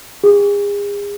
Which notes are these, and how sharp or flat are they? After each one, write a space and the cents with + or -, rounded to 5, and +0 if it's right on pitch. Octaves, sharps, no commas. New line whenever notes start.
G#4 -40